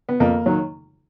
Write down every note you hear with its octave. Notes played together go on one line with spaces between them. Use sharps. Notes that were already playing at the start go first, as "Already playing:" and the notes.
B3
F2 A#3
D#3 F#3